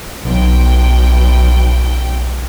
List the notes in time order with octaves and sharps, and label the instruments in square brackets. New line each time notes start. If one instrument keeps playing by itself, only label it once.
[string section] B1 G5